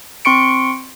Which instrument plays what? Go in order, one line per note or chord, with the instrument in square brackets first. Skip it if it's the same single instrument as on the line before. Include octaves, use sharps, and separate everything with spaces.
[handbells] C4 C6 C#6 C#7 D7